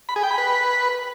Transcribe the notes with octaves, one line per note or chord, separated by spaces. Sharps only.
B5
G#4
G5
B5
B4